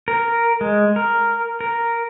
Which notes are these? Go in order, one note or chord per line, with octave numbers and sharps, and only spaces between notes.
A#4
G#3
A#4
A#4